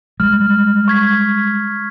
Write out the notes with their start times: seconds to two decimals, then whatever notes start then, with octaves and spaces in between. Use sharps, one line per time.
0.20 G3 G#3 F6
0.88 C#6 G#6 B6